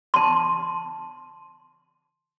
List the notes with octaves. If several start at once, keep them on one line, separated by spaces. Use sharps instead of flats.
A5 C6